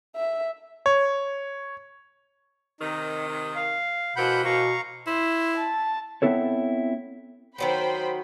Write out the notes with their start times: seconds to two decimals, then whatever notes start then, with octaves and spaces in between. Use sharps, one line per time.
0.16 E5
0.86 C#5
2.80 C3 D#3 D#4
3.55 F5
4.16 B2 E3 A#3 C4 F#5 B5 G6
4.45 B2 F5 A#5 C#6
5.07 E4 C5
5.57 A5
6.22 B3 C4 E4 A4 C#5
7.58 D#3 F#3 B3 C5 G5 B5